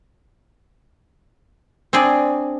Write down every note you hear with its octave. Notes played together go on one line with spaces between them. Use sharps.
C4 D4 G#4 D5